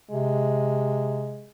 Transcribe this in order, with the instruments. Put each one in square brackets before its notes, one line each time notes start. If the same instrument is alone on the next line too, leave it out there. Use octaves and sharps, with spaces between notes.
[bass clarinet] C3 [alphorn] G#3